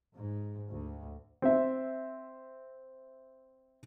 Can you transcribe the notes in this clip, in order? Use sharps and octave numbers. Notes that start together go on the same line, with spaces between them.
G#2
D2
C4 E5